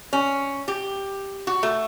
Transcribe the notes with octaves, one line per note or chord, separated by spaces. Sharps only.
C#4
G4
F#4
A3